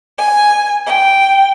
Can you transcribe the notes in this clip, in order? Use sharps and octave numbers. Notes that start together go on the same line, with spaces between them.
G#5
G5